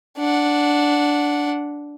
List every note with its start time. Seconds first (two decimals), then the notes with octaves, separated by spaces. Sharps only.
0.18 D4 F#5